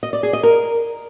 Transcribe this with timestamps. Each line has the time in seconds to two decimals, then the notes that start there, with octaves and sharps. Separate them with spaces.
0.03 D#5
0.13 D5
0.23 G#4
0.33 D#5
0.43 A#4